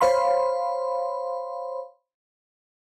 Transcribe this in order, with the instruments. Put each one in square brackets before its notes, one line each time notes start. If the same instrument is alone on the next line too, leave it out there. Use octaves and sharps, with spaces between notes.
[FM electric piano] C5 C#5 F5 B5 C6